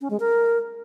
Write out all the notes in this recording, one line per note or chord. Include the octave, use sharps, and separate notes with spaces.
C#4
G#3
A#4